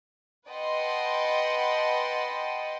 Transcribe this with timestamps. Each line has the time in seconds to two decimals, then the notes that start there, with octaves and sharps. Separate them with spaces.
0.50 B4 D#5 F#5 G5 A5 C6